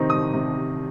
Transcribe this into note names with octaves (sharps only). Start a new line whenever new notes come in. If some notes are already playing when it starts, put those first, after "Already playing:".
Already playing: C3 D#3 C4 D#4
D#6
C3